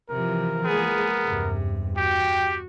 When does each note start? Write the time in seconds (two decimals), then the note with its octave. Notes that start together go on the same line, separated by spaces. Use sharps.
0.10 C3 E3 F3 A#4
0.65 G#3 A#3 B3 G#4
1.25 E2 G2 C3
1.97 F#4 G4 G5